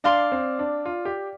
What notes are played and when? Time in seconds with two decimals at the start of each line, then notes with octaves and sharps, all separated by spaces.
0.04 D4 D5 F5 C6
0.32 C4
0.59 D4
0.86 F4
1.05 G4